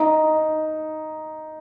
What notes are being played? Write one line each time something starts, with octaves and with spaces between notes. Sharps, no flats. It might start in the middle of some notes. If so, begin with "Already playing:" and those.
Already playing: D#4